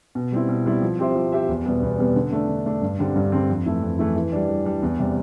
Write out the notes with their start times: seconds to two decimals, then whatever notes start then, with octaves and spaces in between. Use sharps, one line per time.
0.15 B2
0.32 G3 C4 E4
0.49 B2
0.66 G3 C4 E4
0.82 F3
0.99 C4 G4 C5 E5
1.15 F3
1.32 C4 G4 C5 E5
1.48 E2
1.66 B2 G3 B3
1.83 E2
1.98 B2 G3 B3
2.16 D3
2.32 A3 D4
2.48 D3
2.66 A3 D4
2.82 G2
2.98 D3 G3 C4
3.16 G2
3.32 D3 G3 C4
3.49 F2
3.66 E3 A3 E4
3.82 F2
3.99 E3 A3 E4
4.16 E3
4.32 G3 D4
4.49 E3
4.65 G3 D4
4.82 E2
5.00 C3 G3